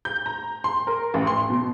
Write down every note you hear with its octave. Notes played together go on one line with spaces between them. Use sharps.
G6
A#5
C6
A#4
A1
C6
B2